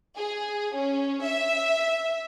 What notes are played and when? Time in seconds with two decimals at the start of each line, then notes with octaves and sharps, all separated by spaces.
0.16 G#4
0.76 C#4
1.23 E5